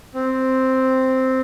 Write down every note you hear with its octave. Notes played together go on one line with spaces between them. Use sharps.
C4